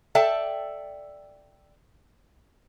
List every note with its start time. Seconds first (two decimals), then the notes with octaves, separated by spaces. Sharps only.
0.15 A4 D5 E5 G5 A5